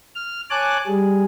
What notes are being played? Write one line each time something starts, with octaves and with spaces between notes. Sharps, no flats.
F6
C#5 G#5 A5 D6 F#6
G3 G#4